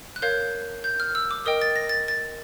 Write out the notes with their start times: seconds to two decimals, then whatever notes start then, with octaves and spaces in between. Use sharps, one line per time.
0.16 F#6
0.22 A#4 C#5 F5 G6
0.84 G6
1.00 F6
1.15 E6
1.31 D6
1.46 A#4 D#5 G5 D#6
1.62 A6
1.76 A#6
1.89 A6
2.08 A6